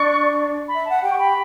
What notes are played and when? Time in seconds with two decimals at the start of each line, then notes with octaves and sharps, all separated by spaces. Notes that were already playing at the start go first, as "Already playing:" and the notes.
Already playing: D4 D5 C#6
0.68 B5
0.75 E5
0.85 F#5 A5
1.02 G4 G5
1.11 C#6
1.19 B5